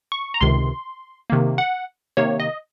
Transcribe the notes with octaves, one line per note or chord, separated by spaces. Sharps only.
C#6
A#5
C#2 C3 D#3 C6
C3 D#3 A#3
F#5
C3 D#3 A#3 C#5
D#5